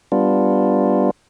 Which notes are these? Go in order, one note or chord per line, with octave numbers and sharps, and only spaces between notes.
G3 B3 D4 F4